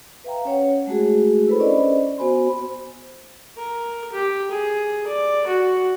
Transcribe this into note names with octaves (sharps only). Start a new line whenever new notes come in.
B4 E5 F5 G5 A#5
C#4 C#5 F#5
G#3 A3 F#4 G#4
E4 A4 B4 C5 B5
C#4 D4 C5 D5 D#5
B3 F#4 C5 G#5 B5 C6
A#4
G4
G#4
D5
F#4